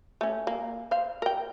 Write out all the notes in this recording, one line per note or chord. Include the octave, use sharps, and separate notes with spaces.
A3 C#4
A#3
C5 F5
A#4 G5